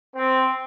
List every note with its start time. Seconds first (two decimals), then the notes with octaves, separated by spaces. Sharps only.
0.13 C4